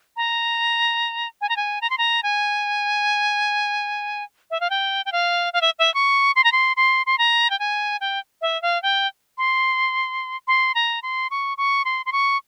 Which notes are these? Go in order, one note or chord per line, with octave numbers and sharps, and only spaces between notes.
A#5
G#5
A#5
G#5
A#5
C6
A#5
G#5
E5
F5
G5
G5
F5
F5
E5
E5
C#6
C6
A#5
C6
C6
C6
A#5
G5
G#5
G5
E5
F5
G5
C6
C6
A#5
C6
C#6
C#6
C6
C6
C#6